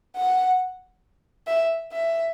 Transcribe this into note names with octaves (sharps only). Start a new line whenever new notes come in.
F#5
E5
E5